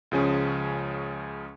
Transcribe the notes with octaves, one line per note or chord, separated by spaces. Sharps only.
C#2 C#3 F3 C#4 G#4